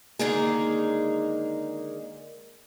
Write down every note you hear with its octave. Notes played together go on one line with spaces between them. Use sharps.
D3 D#3 G#3 A#3 D#4 G#4